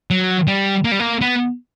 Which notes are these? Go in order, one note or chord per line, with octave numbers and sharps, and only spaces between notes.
F#3
G3
A#3
G3
A#3
B3